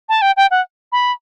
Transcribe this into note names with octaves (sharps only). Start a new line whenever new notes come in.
A5
G5
G5
F#5
B5